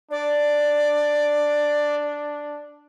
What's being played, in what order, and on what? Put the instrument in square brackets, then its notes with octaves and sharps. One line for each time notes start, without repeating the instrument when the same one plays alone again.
[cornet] D4 [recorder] D5